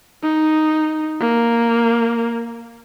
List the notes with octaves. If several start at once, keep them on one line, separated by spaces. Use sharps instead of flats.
D#4
A#3